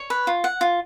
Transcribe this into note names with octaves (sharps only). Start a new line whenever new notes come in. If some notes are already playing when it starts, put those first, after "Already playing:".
Already playing: C#5
B4
F4
F#5
F4